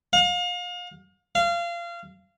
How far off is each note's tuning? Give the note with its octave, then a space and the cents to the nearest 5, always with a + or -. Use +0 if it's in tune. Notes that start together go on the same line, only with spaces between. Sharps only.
F5 +35
F5 -25